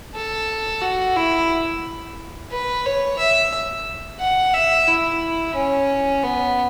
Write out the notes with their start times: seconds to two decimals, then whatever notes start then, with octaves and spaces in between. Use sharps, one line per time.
0.15 A4
0.82 F#4
1.16 E4
2.52 B4
2.86 C#5
3.19 E5
4.20 F#5
4.54 E5
4.87 E4
5.55 C#4
6.23 B3